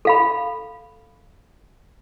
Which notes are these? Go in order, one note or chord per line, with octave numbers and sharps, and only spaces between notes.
A4 F5 B5